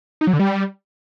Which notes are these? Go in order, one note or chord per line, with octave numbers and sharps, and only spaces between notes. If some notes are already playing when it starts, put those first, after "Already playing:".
D#4
F#3
D3
G3